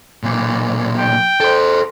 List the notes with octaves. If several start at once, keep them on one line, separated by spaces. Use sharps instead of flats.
B1 A#2
G5
A4 C5